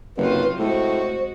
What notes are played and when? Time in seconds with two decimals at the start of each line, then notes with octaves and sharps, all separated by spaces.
0.17 F#1 C3 F#3 F4 B4
0.59 A2 G#3 F#4 C5